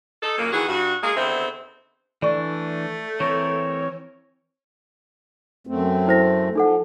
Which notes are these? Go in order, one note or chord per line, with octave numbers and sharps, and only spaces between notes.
D#4 A4
A#2 C#3 F#3 A#3
D#3 E3 F#4 G#4
G2 F#4
G#3 A#3 D#4 G#4
E2 D3 D#3 C4 C5 E5
E3 A3 D4 D5 C#6
E3 C4 A#4 C#5
F#2 A3 C4
E4 C5 A#6
F3 D#4 A4 F#5